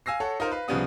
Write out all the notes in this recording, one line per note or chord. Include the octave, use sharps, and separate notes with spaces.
F5 G#5 E6 A#6 C7
A4 C#5 F#5
D#4 F4 A#4 C5
B4 F5
C2 C#3 F3 G3 B3 D#6